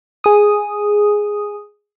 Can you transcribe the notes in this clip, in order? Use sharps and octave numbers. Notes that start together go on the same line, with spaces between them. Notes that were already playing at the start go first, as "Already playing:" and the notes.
G#4 D#6